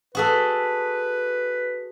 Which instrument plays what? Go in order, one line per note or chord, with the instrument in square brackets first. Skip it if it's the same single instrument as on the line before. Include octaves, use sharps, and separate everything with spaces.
[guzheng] F#4 G#4 A4 [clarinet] B4